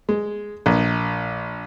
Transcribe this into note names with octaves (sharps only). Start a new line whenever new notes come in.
G#3
A#1